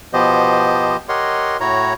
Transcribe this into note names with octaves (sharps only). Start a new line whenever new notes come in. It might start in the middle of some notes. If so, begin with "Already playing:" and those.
B2 F3 B3 G4 C5 D#5
G4 A#4 C#5 D#5 F#5 C6
A2 E4 F#4 C#5 A#5